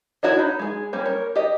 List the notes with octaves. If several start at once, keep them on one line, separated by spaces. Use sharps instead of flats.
D4 E4 F#4 C#5 D#5
D#4 B5
G#3 G#4
G3 A#3 C#4
A#4 C#5
G4 D#5